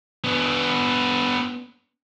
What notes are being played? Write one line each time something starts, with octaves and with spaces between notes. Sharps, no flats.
B3 D4